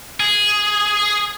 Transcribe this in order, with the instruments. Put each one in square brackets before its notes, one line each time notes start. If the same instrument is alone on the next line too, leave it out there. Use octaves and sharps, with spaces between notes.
[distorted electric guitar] G#4